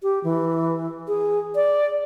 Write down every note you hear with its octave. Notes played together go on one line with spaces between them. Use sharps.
G4
E3
G#4
D5